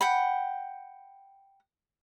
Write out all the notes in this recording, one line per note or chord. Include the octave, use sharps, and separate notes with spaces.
F#5 G5 B5